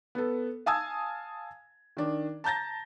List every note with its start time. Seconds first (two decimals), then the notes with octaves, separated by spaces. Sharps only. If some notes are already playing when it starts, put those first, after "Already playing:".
0.15 B3 A4
0.66 F5 G#5 A5 D#6 E6 G#6
1.97 D#3 D4
2.44 A5 A#5 G6 A6 A#6